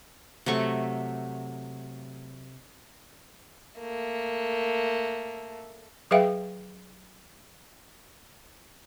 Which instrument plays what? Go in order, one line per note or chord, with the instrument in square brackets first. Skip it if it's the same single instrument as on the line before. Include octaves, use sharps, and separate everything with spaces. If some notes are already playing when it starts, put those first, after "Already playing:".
[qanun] C3 F#3 A3 C#6
[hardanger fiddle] A3 A#3
[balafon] F#3 G#4 B4 E5 F5 G5